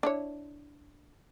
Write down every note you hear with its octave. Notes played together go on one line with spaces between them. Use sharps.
D4 E4 C#5